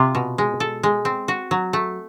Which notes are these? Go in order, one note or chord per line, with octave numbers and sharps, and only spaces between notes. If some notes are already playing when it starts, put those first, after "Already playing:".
Already playing: C3 F4
B2
G#3
A4
G#3
C4
F#4
F#3
A3